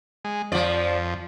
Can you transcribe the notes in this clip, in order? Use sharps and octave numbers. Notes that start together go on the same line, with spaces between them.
G#3
F2 F3 D5